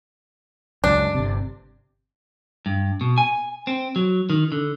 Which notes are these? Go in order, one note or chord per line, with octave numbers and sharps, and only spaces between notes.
C#2 F#2 D4
G1 C3
G2
B2
G#5
C4
F#3
D#3
D3